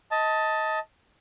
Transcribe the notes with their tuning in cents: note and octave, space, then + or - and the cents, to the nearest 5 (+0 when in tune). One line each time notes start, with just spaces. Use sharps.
D#5 +25 A5 +5